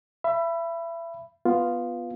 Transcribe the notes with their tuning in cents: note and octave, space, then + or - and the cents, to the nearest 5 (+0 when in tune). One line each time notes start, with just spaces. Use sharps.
E5 +30 B5 +0
B3 +0 F4 +0